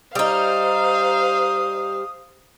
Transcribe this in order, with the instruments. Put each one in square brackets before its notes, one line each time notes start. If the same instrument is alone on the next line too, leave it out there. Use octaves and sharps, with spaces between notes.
[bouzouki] G3 D#4 [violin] C5 F5 [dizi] D#6